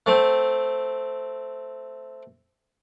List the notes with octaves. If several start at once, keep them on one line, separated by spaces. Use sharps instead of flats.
A3 C4